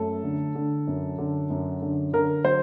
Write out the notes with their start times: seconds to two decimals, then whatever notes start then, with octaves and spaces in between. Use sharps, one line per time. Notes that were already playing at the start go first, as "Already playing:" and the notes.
Already playing: F#2 A3 A4
0.24 D3
0.55 D3
0.87 F#2
1.18 D3
1.50 F#2
1.82 D3
2.13 D3 A#4
2.44 F#3 C5